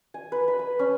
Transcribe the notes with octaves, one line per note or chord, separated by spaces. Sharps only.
G#5
B4
B5
E6
C#4